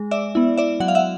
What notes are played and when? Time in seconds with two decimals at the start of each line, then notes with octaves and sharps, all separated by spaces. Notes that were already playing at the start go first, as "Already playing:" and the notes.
Already playing: G#3
0.11 D5 E5
0.35 B3 E4
0.58 D5 E5
0.80 F#3 F#5
0.88 F5
0.95 E5 F#5